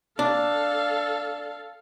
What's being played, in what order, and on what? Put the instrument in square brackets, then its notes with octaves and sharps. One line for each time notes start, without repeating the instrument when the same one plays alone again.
[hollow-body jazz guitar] D4 [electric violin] A4 F5